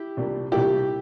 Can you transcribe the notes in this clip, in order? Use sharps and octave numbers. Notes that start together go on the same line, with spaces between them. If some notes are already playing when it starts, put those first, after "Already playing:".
Already playing: E4 G4
C2 A#2 G3 D4
C2 A#2 G3 D4 E4 G4